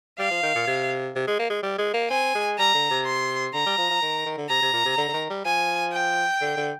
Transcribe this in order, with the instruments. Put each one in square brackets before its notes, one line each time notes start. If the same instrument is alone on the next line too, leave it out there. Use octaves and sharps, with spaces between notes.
[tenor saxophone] G3 [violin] F5
[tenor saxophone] F3
D#3
A#2
C3
C3
G#3
A#3
G#3
G3
G#3
A#3
[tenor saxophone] C4 [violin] G#5
[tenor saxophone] G#3
[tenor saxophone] G3 [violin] A#5
[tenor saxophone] D3
C3
[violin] C6
[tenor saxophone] D3 [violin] A#5
[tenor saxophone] G3
F3
F3
D#3
D#3
D3
[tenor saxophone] C3 [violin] A#5
[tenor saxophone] C3
A#2
C3
D3
D3
D#3
G3
[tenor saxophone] F3 [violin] G#5
[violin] G5
[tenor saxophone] D3
D3